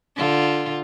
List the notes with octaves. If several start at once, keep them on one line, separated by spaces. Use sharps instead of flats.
D3 F4